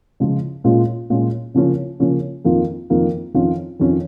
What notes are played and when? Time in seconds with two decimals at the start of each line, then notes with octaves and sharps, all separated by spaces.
0.20 C#3 F3 G#3 F4
0.64 A#2 G#3 C#4 F4
1.10 A#2 G#3 C#4 F4
1.54 C#3 F3 A#3 C#4
2.00 C#3 F3 A#3 C#4
2.45 F2 D#3 A#3 F4
2.90 F2 D#3 A#3 F4
3.34 F2 D#3 C#4 F4
3.80 F2 D#3 C#4 F4